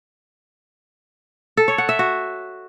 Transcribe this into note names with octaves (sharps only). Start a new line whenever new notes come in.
A4
C#5
F#5
E5
F#4